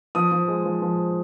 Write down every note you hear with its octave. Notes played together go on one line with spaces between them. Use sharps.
F3 D#6
F3
G#3
F3
F3